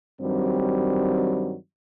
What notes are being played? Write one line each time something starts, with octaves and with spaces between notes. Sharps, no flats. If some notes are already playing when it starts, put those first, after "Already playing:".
G2 D#3 F#3 G3 C4